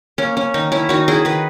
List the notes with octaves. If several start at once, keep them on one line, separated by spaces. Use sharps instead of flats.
A#3 C#4
C#4
D#3 D#4
C#4 E4
D#3 D#4 F#4
E4 G#4
D#3 G#4 B4